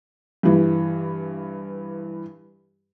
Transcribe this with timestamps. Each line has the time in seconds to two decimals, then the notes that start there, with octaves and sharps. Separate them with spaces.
0.43 G2 E3